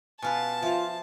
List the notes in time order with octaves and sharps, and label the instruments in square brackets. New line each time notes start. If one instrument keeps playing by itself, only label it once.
[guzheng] B2 F4 B4 [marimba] G#5 [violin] A5
[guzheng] F3 [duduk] F4 [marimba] E5 F5